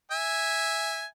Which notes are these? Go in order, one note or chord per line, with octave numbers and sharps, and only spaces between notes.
E5 G#5